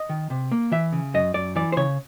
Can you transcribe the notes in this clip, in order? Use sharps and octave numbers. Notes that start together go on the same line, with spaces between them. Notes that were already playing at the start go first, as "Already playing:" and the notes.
Already playing: D#5
D#3
C3
A#3
E3 E5
C#3
F#2 D#5
F#2 D5
E3 D5
C5
C#3 C#5